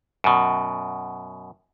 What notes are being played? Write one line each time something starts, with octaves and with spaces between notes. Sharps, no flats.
F#2 B2